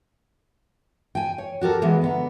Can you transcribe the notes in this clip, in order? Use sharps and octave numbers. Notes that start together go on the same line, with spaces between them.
G5 G#5
C#5
F#4 G4 A4 A#4
E3 G#3 B3
D3 B3 A#5